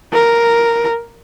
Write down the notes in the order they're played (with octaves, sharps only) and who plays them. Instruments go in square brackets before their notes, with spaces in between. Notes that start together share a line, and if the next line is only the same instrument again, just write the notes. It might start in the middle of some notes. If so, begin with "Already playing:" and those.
[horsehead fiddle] A#4